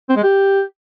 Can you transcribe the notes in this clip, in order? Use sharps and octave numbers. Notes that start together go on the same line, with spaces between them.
C4
G#3
G4